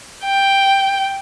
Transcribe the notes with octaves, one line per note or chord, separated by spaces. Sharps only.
G5